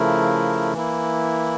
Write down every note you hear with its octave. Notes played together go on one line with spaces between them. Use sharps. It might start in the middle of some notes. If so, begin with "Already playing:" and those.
Already playing: C#3 F3 A3 E4 A#4
E3 A#3 E4